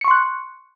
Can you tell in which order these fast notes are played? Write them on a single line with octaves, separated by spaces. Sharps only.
C#7 C#6 C6 F#6